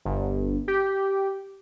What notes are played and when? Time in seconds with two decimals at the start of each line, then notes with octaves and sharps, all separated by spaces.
0.05 G1
0.68 G4